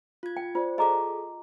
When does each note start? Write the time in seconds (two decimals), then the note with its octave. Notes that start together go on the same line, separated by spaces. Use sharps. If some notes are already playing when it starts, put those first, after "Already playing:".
0.23 F4 G#6
0.37 G5
0.55 F4 C5 D5
0.78 G#4 A4 D#5 A#5 D6